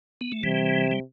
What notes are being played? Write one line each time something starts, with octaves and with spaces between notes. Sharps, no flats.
B3
A3
C3 E3 G3
G3